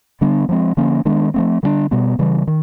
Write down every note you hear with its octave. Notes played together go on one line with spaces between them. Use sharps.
D3 G3 B3 D4
F3 G#3 C4
D3 F3 A#3 C#4
D#3 G#3 B3 D4
F3 A3 C4
D3 G3 B3 D4
B2 G3 B3
C#3 E3 G3
D#3